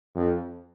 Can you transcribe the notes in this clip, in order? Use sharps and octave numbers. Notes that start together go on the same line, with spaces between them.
F2